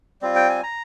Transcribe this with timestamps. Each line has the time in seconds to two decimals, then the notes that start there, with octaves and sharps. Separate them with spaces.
0.22 G3 C4 F4
0.36 G5
0.49 G#5
0.63 A#5